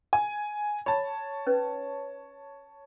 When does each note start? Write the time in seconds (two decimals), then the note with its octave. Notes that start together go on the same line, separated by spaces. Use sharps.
0.13 G#5
0.86 C#5 A5 B5
1.47 C#4 D#4 B4